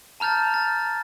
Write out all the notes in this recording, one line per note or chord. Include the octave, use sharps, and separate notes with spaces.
A5 A#5 F6 G6 A6
A6